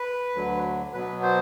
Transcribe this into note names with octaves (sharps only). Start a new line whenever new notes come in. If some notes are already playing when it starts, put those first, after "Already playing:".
Already playing: B4
D2 D3 F#3
B2 F#3 B3 B4
C5